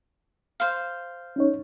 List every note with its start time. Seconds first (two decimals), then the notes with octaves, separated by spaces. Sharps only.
0.60 C5 F5
1.36 C#4 D#4 C#5